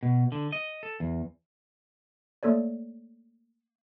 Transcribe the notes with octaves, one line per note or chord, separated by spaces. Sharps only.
B2
D3
D#5
A4
E2
A3 A#3 A4 C#5 D5